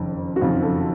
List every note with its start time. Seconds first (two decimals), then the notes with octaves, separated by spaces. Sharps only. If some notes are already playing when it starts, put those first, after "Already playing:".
Already playing: F#1 F2 D#3
0.36 F#4
0.41 F#1 F2 D#3 F4
0.63 A4